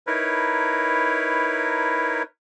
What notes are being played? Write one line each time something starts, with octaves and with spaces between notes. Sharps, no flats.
D#4 E4 A#4 B4 C#5